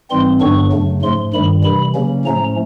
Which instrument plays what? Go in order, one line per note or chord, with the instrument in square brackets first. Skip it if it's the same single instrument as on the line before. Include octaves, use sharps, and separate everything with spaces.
[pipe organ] G#2 E3 G3 C4 C6
G2 D3 F#3 B3 D4 C#6
F#2 C#3 F#3 A3
G#2 F3 A3 C6
G2 D#3 G3 B5
C3 E3 G3 B5
C#3 F#3 A#3 C#4
A2 F3 A3 C#4 A#5